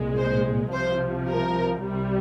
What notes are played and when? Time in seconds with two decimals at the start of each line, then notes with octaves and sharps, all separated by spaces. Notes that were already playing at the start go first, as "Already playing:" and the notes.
Already playing: C2 A#2 G#3
0.18 C5
0.73 C2 C3 F3 C5
1.29 A#4
1.84 C2 C3 G3